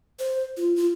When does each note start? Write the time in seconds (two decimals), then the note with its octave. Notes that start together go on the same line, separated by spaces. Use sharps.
0.19 C5
0.57 F4
0.76 F4